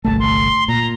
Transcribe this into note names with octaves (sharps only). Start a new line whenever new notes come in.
G1 C2 A3 A5
C6
A#2 A#5